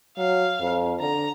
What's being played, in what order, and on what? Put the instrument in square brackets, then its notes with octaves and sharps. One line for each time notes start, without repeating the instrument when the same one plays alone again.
[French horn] F#3 [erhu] F5
[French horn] F2
[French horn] D3 [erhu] A#5